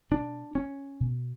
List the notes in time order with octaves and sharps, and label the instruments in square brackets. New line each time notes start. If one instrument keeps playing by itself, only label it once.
[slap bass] B2 D4
C#4
B2